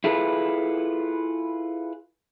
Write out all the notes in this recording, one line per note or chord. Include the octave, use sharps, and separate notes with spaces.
E4 F4 G#4 A4 B4